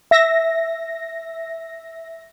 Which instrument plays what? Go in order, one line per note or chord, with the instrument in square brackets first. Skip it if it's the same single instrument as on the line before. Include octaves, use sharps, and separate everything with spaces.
[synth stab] E5 A#6